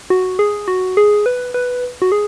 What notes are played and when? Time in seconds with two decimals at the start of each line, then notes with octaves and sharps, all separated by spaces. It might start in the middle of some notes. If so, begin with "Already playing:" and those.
0.10 F#4
0.39 G#4
0.68 F#4
0.97 G#4
1.26 B4
1.54 B4
2.02 F#4
2.12 G#4